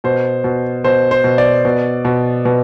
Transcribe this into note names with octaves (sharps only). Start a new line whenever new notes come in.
B2 C5
B2
B2 C5
C5
B2
D5
B2
B2
B2